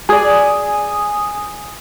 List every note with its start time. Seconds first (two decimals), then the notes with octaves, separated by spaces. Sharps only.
0.09 G#4 D5 G#5 D#6